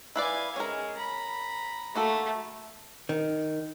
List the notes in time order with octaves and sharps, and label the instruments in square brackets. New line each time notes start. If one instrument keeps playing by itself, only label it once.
[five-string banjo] E4 B4 D5 [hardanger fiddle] F5 G#5
[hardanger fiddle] G#3 [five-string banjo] C#4 A#4
[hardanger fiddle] A#5 B5
[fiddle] A3 [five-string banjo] A#3 F#4 A4
[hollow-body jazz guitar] D#3